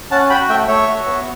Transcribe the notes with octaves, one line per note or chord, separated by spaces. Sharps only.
C#4 F#5 A5
F#4 G5 B5
A3 E5 G5
A3 C#5 E5
F#4
B3